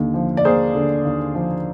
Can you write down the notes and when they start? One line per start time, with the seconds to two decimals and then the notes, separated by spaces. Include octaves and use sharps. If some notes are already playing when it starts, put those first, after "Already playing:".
Already playing: D#2 D3
0.14 F3
0.37 D5
0.45 A#3 G#4 C5
0.75 D3
1.05 D#2
1.35 F3